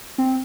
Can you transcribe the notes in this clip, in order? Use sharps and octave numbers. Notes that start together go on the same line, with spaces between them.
C4